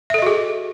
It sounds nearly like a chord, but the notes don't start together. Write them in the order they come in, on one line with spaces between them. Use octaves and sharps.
E5 A4 D#5 F#4 G#4